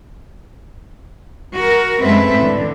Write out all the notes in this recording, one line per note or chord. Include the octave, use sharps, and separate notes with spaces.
F#4 A#4
F#2 G#3 A3 C4 B4 E5
A2 D3